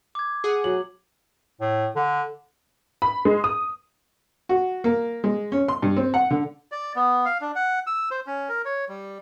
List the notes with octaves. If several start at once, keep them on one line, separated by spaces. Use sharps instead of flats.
D6 G#6
G#4 F#5
F#3 F#7
A2
D3
B5
G#3
D#6
F#4
A#3
G#3
C#4
C6
G2
C4
F#5
D3
D5
B3
F5
D4
F#5
E6
C5
C#4
A#4
C#5
G3